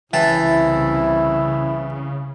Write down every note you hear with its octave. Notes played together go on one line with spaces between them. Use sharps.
C2 C#3 E3 E4 G5 A5